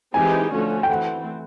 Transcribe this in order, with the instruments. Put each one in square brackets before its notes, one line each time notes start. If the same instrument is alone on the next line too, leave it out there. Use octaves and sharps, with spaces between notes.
[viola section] E3 G#3 C4 D#4 G4 [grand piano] G#5
[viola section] D3 F3 A3 C#4 F#4
[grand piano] G5
[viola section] E3 A3 C4 [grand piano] F#5